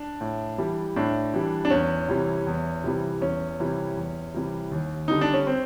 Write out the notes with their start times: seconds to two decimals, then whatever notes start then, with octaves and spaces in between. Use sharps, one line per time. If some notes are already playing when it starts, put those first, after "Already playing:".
Already playing: D4
0.21 A2
0.58 E3 G3
0.96 A2 D4
1.34 E3 G3
1.65 D4
1.70 E2 C#4
2.08 C3 E3 G3
2.47 E2
2.84 C3 E3 G3
3.21 E2 C#4
3.60 C3 E3 G3
3.97 E2
4.34 C3 E3 G3
4.72 D#2
5.08 D3 G3 D#4
5.21 D4
5.34 C#4
5.47 C4